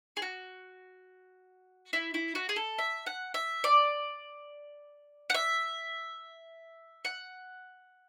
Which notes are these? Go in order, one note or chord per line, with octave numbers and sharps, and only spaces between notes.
G#4
F#4
E4
E4
F#4
G#4
A4
E5
F#5
E5
D5
F#5
E5
F#5